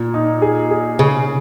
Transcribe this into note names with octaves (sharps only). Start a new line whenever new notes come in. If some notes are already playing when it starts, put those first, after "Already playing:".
Already playing: A#2
D#4
G#4
G#4
C#3 G#4